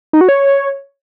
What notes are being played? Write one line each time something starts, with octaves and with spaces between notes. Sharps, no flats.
D#4
F#4
C#5